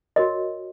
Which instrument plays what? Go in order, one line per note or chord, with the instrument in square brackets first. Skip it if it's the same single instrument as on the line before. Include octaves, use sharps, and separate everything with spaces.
[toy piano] F#4 A#4 C#5 D#5